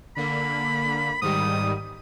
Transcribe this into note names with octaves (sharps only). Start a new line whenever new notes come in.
D3 A#3 B5
G#2 D#3 G3 D#6